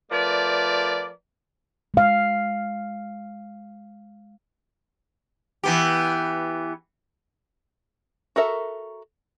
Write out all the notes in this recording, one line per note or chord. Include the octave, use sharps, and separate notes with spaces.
F3 A3 A#4 B4 D5
G#3 F5
E3 B3 G4
F#4 A4 A#4 E5